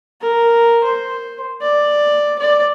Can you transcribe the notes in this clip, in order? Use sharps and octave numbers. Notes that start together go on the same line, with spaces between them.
A#4
C5
D5
D5